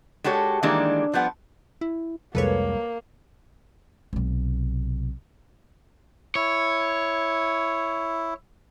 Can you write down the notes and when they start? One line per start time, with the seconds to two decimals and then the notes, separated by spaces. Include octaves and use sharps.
0.24 G#3 F#4 G4 A4 C#5
0.63 D#3 E3 G3 G#3 A#3 D4
1.13 F3 G3 B3 F#5
1.81 E4
2.35 C2 F2 G3 G#3 A#3 A4 B4 C#5
4.13 B1 C3
6.35 E4 C#5